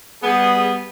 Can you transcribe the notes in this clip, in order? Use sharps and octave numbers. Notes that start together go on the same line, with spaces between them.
G3 B3 G#4